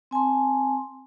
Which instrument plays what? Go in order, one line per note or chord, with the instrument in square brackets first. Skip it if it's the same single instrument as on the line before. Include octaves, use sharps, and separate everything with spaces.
[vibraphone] C4 G#5 A5 C6